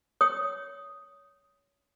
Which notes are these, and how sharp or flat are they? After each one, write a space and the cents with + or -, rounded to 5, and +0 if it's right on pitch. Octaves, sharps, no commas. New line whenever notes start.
C#5 +25 D#6 +0